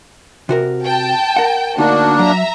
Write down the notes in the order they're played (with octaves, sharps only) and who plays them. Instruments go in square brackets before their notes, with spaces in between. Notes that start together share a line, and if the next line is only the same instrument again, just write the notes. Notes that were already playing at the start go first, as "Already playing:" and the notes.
[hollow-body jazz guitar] C3 F#4 A#4
[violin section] G5 A5
[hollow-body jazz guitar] A#4 F#5
[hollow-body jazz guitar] D2 D#4 [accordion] A#3 D4 [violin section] F#4
[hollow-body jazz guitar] F#3 [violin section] E5 A#5